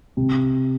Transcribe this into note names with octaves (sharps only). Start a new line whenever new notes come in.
C3